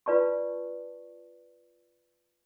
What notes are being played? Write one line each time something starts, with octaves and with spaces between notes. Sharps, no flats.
F4 B4 D5 A5 C#6